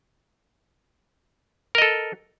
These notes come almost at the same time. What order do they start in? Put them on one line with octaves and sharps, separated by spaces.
A#4 D#5 A4